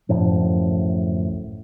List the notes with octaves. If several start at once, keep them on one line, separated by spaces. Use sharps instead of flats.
D1 F#2 A2 F3